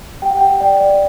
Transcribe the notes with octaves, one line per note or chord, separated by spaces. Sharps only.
G4 G5
F#5
G4 G5
D5 G5
D5